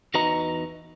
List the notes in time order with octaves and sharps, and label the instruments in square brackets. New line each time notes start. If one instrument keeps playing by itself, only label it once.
[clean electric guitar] E2 D#4 F#4 B4 D#5 A#5